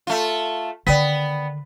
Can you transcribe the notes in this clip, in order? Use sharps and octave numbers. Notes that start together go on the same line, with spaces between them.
A3 F4
D3 D#3 B3 D5 G5 B6